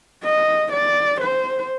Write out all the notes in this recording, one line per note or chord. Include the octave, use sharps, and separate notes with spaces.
D#5
D5
C5